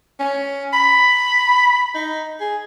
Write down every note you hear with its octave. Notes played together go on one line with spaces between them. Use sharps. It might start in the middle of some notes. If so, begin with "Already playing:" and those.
C#4
B5
D#4
G#4